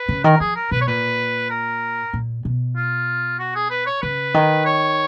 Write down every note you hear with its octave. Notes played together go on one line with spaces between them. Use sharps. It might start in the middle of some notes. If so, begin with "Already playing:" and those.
Already playing: B4
C#3
D#3 A#4
F3 G#4
A#4
B2 B4
C#5
A#2 B4
A#4
A#2
B2
F4
F#4
G#4
B4
C#5
C#3 B4
D#3
C#5